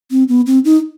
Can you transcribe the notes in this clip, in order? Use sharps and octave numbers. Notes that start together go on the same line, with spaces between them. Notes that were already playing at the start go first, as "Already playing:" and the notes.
C4
B3
C4
D#4